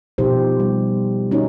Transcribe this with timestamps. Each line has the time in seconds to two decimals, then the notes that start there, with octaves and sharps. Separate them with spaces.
0.18 B2 F3 D#4 G4 C5
0.60 G3
1.31 C#4 D#4 E4 F#4 C#5